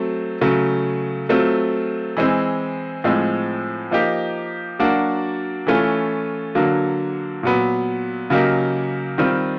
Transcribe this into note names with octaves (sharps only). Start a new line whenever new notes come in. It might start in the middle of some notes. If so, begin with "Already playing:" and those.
Already playing: F#3 A3 C4
C#3 F#3 A3
F#3 A3 C4 F4
E3 G#3 C4
A2 F3 G#3 C4
F3 A#3 D#4 G4
F#3 A#3 D4 F#4
E3 A3 C#4 F4
D3 F#3 A#3
A#2 F#3 B3
C#3 F#3 A#3 D#4 G4
D#3 G3 C4 F4